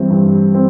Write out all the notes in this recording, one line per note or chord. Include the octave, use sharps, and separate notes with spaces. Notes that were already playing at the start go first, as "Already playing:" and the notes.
Already playing: G2 E3 G3 C4
G2
C4